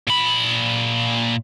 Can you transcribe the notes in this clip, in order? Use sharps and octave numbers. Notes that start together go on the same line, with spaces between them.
A#2 B5